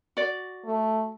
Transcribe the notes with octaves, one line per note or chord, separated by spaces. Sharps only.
F#4 D5
A3